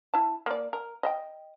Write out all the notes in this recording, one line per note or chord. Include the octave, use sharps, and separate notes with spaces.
E4 A5
A#3 D5
A#4
D#5 E5 G5